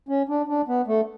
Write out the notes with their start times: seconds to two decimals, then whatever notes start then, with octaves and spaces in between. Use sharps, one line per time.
0.09 C#4
0.29 D4
0.48 D4
0.68 B3
0.87 A3